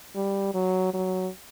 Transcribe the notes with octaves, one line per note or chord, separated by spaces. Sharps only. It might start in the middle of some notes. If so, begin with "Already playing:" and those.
G3
F#3
F#3